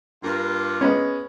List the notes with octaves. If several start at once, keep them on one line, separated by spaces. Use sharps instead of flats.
G2 A#3 F4
G#3 B3 C#4